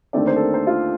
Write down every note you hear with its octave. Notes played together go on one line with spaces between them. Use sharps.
D#2 D3 A3 C4 D5
C5
A4
A#4
C5
F4